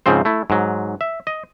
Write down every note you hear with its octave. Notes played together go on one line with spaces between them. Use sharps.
G#2 C#3 F3 C4 C5
A3 E4
G#2 F#3
E5
D#5